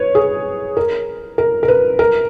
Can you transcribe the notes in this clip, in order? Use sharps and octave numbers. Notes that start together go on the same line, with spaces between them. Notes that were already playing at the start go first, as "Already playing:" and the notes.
Already playing: B4 C#5
G#4
A#4
A#4
A#4
B4
A#4